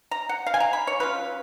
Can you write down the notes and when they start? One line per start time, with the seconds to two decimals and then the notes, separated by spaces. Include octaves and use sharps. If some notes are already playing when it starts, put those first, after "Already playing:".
0.11 A#5
0.29 F#5
0.47 F5
0.54 G#5
0.60 A#5
0.73 B5
0.87 C#5
1.00 F#3 C#4 F4 B4